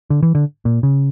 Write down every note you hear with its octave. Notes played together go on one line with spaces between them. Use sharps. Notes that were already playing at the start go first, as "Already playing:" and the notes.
D3
E3
D3
A#2
C#3